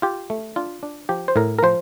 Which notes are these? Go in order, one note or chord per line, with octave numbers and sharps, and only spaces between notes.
F4 G4
A3
D4 F4
D4
F3 G4
C5
A2 A#4
A#4
F3 C5